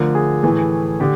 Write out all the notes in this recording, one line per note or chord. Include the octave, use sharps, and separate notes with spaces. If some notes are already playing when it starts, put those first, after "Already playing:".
Already playing: D3 F3 A3 A#4
G#4
A2 E3 A3
D3 G4